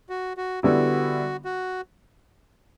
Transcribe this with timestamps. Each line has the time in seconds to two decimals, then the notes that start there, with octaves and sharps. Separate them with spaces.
0.09 F#4
0.37 F#4
0.63 D3 G3 B3 E4 F#4
1.45 F#4